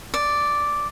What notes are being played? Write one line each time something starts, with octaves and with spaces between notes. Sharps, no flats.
D5